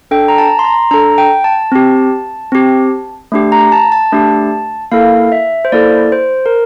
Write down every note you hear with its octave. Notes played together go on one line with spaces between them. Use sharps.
D4 A4 G5
A#5
A5
C6
A#5
D4 A4 A#5
G5
A5
C4 G4
C4 G4
A3 D4 G4
A#5
A5
A5
A3 D4 G4
A#3 E4 A4 F5
E5
C5
A#3 E4 A4 D5
C5
A#4